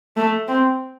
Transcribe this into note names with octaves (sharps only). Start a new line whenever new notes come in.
A3
C4